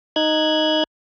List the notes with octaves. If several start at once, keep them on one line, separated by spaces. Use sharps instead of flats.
D#4 F#6 G#6